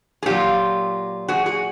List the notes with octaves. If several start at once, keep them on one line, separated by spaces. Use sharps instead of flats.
G#4
A#2 F#3 F4 G4
F#4 G#4
F#4 G#4